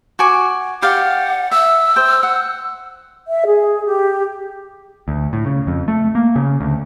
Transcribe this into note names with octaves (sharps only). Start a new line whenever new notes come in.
F#4 G#5 D6
G4 D5 F5 F#5
E5 E6
C5 G5
F#5
E5
G#4
G4
D2
A2
C#3
F2
A3
A#3
C#3
D2